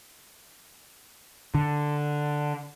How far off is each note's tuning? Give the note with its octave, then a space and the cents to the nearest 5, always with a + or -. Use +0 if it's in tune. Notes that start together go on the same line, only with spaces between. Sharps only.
D3 +5